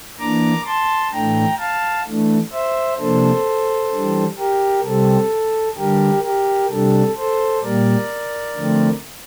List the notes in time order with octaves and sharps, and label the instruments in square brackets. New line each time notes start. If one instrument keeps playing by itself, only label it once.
[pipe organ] E3 A#3 D4 A#5 D6
A5 C6
A2 E3 A3 D4 G5 A#5
F5 A5
E3 A3 D4
C5 E5
C3 F3 A#3 D4 A4 C5
E3 G3 D4
G4 A#4
C3 G3 C4 A4
D3 G3 D4 G4 A#4
G4 A#4
C3 G3 D4 A4
A4 C5
A#2 G3 A#3 A#4 D5
D3 F3 A3 C4